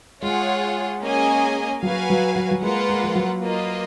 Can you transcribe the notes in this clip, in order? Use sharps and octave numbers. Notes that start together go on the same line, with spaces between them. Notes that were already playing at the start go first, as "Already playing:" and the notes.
G#3 F4 G#4 C#5 F#5
A#3 C#4 G#4 D#5 G#5
F#3 F#4 B4 F5 G#5
F#3
F#3
F#3
G#3 A#3 F4 B4 F#5
G#3
F3
F#3
A#3 F4 B4 D#5